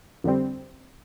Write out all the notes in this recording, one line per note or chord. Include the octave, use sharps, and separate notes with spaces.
F2 D3 G3 C4